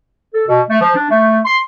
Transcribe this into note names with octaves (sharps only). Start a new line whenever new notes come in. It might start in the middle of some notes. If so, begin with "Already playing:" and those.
A4
B2
A3
F3
D4
A3
C6